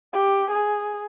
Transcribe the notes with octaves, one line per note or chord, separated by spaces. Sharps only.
G4
G#4